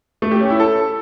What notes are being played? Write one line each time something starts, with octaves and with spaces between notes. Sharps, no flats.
A3
G4
C#4
E4
A4